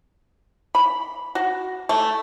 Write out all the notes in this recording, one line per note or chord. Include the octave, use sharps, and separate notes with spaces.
B5
F#4
A3